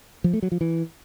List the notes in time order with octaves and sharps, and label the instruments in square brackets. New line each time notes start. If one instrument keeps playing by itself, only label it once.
[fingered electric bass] F3
A3
F#3
F3
E3